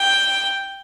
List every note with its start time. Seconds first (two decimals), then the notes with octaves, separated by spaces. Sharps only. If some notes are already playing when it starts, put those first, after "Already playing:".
Already playing: G5